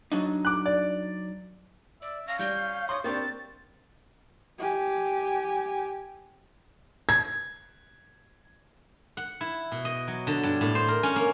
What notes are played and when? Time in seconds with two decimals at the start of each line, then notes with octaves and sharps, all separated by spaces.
0.12 F#3 D4 D#4
0.45 D6 F#6
0.66 D5
2.02 D5 E5
2.27 C#4 F5 A#6
2.39 G3 G6
2.89 C#5 C6 D#6
3.04 A#3 C4 D4 G4 C#6 A6
4.59 G4 G#5
7.09 G#6
9.17 F#5
9.41 E4
9.72 B2
9.85 D#5
10.08 F#3
10.27 D3
10.43 G2
10.61 A2
10.75 C5
10.88 A#4
11.03 C#4
11.16 A#3